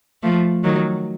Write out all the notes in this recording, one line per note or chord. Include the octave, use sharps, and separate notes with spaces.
F3 A3
D#3 F#3